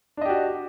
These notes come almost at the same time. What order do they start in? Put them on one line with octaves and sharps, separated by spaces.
D4 D#5 G4 F#4